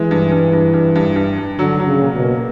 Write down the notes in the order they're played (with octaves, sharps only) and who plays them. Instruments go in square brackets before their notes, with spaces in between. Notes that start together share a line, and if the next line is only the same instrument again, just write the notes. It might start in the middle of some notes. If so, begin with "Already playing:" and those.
Already playing: [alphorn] E3 [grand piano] G#3
[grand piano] G2
G2
G2
G2
G2
G2
G2
[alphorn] D3 [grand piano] F#3
[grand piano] F#3
[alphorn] C#3
[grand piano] A#2
[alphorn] B2
[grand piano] A#3